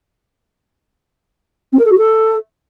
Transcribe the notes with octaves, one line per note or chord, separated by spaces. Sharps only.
C4
A#4
A4
F#4
A4